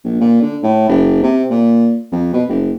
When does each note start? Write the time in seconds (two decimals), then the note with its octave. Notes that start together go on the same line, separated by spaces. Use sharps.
0.04 A#1
0.20 A#2
0.41 D3
0.63 A2
0.89 F#1
1.22 C3
1.50 A#2
2.12 F2
2.33 B2
2.48 F#1